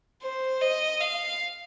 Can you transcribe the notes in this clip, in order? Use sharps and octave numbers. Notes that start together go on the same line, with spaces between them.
C5
D#5
F5